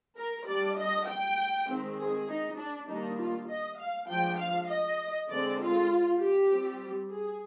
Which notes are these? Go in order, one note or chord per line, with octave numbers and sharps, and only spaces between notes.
A#4
G3 D4 D5
D#5
G5
D#3 G#3 C4
G#4
D#4
D4
D#3 G3 A#3 D4 D#4
F4
D#5
F5
F3 G#3 D4 G5
F5
D#5
D3 G#3 C4 D5
F4
G4
G3 C4
G#4